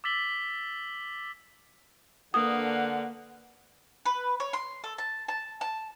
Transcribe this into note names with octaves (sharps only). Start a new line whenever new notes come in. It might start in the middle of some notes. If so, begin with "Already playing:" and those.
D6 E6 A6 B6 F#7 G7
D3 A#3 B4 F#5 D#6
B4
C#5
C6
A4
A5
A5
A5